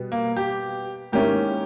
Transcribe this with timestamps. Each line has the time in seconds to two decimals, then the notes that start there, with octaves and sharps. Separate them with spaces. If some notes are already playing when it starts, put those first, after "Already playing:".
Already playing: B2 G3 B3
0.12 A#3
0.37 G4
1.12 G#2 D#3 A#3 C#4 E4 G4